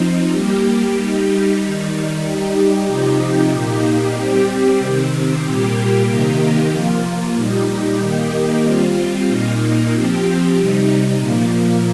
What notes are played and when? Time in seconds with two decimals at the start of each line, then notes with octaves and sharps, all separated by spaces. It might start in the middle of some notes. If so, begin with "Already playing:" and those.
Already playing: F3 C4 D#4
0.30 G3 A#3 G4
0.94 G3 D#4 G4
1.58 D#3 G3 D#4
2.22 G3 D#4 G4
2.86 C3 F3 D#4 G4
3.50 A#2 A#3 D#4 G4
4.14 G3 C4 G4
4.78 C3 D#3 C4
5.42 A#2 G3 A#3 G4
6.07 C3 D#3 A#3 D#4 G4
6.70 F3 A#3 F4
7.35 A#2 G3 D#4 G4
7.99 D#3 A#3 D#4 G4
8.63 G3 C4 F4
9.27 A#2 A#3 D#4
9.91 F3 C4 G4
10.55 C3 G3 D#4
11.19 A#2 F3 A#3